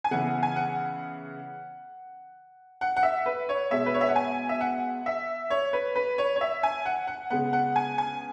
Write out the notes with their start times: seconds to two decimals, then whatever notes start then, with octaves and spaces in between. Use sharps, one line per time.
0.04 G#5
0.11 C#3 E3 B3 F#5
0.43 G#5
0.56 F#5
2.81 F#5
2.96 F#5
3.03 E5
3.26 B4
3.49 C#5
3.71 B2 G#3 B3 E5
3.86 B4
3.94 C#5
4.01 E5
4.09 F#5
4.16 G#5
4.49 E5
4.61 F#5
5.06 E5
5.50 C#5
5.73 B4
5.96 B4
6.18 C#5
6.36 C#5
6.41 E5
6.63 G#5
6.85 F#5
7.07 F#5
7.30 C#3 G#3 B3 F#5
7.53 F#5
7.76 G#5
7.98 G#5